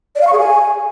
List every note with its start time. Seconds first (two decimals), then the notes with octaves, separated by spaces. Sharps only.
0.15 D5
0.21 F5
0.27 C#6
0.33 G#4
0.39 G#5